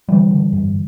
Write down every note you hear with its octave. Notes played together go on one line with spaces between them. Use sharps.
D3 E3 G3
D3
G2